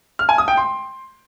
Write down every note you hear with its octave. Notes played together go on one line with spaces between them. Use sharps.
F6
G#5
D#6
G5
C6